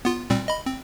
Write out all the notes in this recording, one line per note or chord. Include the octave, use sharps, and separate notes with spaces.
B3 F4
A#2 G3 C4
D#5 B5
C4